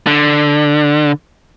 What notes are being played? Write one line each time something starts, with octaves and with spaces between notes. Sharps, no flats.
D3